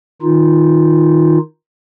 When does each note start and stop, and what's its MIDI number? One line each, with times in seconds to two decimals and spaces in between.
0.22 1.38 51
0.22 1.38 63
0.22 1.38 65